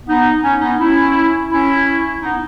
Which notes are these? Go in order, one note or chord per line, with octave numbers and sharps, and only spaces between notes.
B3 D#4
C#4
B3 D#4
C#4 E4
C#4 E4
B3 D#4